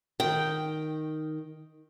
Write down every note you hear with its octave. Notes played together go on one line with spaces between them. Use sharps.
D#3 G5